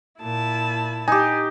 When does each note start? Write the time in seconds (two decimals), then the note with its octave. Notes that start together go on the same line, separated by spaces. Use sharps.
0.21 A#2 E4 A5
1.08 D#4 G4 G#5